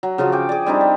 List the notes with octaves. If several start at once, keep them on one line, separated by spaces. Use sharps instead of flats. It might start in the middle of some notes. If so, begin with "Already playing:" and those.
F#3
C#3 F3 C#4 F#4
G5 D6
G#4 D5
G3 C4 D4 D#4
D#5